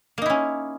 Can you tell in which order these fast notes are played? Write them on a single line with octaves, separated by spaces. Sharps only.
A#3 D#4 E4 C#4